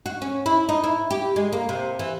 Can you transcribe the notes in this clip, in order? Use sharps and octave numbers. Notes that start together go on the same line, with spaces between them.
F#4
C#4
E4
D#4
E4
G4
G#3
A#3
C3
E3